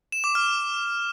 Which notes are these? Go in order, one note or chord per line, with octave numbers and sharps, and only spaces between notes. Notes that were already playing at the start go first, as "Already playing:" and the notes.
E7
D6
F6